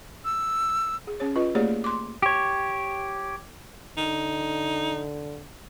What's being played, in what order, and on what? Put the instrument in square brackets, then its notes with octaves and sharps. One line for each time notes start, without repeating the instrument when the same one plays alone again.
[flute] E6
[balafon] G#4
C#4 G#4 C#5
F4 B4 D#5
A3 A#3 G4 G#4 C#5 D5
C6 D6
[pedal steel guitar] G4 C#5
[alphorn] D3 [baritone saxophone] D#4